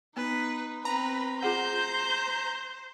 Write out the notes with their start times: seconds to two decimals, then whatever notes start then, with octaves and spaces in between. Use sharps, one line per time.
0.17 B3 D#4 B4
0.85 C4 B4 A#5 B5
1.43 F4 G#4 C5 F#5 G6